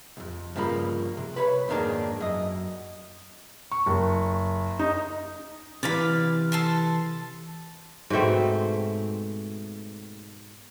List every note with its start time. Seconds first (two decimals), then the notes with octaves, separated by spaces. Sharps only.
0.17 C2 F2
0.56 G2 C#3 F3 A#3 B5
1.17 C3
1.36 B4 C#5 B5
1.68 F2 G#2 D#3 A#3 D4 G#4
2.21 F#2 D#5
3.72 C#6
3.86 F#1
4.79 D#4
5.83 C3 E3 D5 F5 B5
6.52 A4 A5 C6
8.10 G#2 B2 A3 C4